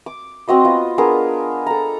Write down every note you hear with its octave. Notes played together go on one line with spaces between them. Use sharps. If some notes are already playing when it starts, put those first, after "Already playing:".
D6
C4 F#4 D#5 C6
B3 F4
B3 D4 G#4 A#4
A4 A#5